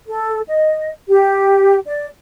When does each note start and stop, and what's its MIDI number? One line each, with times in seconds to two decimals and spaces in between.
0.07 0.41 69
0.48 0.89 75
1.09 1.79 67
1.86 2.07 74